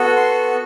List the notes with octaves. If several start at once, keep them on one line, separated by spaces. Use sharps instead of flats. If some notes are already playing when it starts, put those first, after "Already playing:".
Already playing: B3 F#4 A4
C6